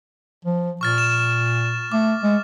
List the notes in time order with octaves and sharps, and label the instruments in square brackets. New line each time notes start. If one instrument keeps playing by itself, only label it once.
[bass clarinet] F3
[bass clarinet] A#2 [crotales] C#6 F6 A6
[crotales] E7
[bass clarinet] A3 [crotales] D6
[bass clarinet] G#3